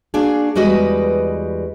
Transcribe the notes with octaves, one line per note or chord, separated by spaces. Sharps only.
A#3 D4 F#4 G#4
E2 G3 G#3 F#4 B4 D#5